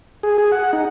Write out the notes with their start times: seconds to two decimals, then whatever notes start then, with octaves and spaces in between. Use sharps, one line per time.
0.23 G#4
0.38 G#4
0.52 F#5
0.73 D#4